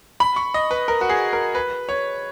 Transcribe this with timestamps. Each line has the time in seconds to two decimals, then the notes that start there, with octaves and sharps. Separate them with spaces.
0.20 B5
0.36 C#6
0.54 D#5
0.71 B4
0.88 A#4
1.01 F#4
1.09 G#4
1.33 A#4
1.55 B4
1.89 C#5